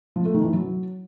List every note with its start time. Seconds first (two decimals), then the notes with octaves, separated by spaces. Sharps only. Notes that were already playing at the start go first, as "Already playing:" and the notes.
0.16 F3
0.25 A3
0.34 D#3
0.44 E3
0.53 F#3